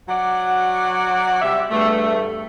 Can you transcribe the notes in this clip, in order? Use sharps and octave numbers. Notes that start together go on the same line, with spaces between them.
F#3 D5 F#5
C3 G3 E5
E2 G2 G3 A3